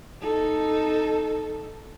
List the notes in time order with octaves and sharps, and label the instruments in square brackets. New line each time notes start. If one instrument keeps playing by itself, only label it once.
[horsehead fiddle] D#4 A4